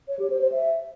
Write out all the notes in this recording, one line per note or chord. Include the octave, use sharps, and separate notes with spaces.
C#5
G4
C5
C5
E5